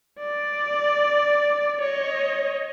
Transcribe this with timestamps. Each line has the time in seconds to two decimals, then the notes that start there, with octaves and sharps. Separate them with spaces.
0.19 D5
1.80 C#5 D#5